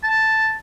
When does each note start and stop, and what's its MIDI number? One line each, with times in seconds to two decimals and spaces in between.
0.03 0.51 81